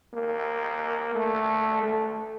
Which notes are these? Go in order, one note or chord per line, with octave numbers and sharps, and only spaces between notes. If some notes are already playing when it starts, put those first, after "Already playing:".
A#3
A3
A3